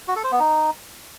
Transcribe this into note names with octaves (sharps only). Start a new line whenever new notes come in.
F#4
A4
C5
B3
D#4